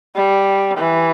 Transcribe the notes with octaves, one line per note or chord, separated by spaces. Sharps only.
G3
E3